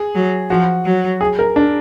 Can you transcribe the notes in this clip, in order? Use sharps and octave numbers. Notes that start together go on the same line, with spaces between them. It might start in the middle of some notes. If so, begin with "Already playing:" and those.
Already playing: G#4
F#3
F3 F#4
F#3
G#4
A#4
D4